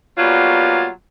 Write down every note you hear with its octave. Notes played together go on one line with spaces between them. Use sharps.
B2 F#3 G3 A#3 F4